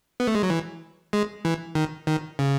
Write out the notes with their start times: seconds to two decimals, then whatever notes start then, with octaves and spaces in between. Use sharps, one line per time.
0.20 B3
0.27 A3
0.35 G#3
0.43 F#3
0.50 E3
1.13 G#3
1.45 E3
1.75 D#3
2.07 D#3
2.39 C#3